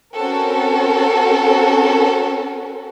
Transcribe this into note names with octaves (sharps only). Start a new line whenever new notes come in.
C4 C#4 F#4 A4 A#4